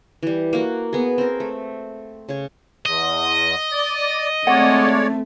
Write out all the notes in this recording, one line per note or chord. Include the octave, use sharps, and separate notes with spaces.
E3 G3
A#3 F#4
B3 G#4
C4 A#4
A3
C#3 C#5
E2 D#5
D5
G#3 A3 C4 C#5 D5 F#5